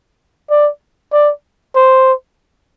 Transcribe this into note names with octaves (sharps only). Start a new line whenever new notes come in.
D5
D5
C5